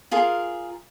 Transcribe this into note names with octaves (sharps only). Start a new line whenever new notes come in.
F4 G#4 A#4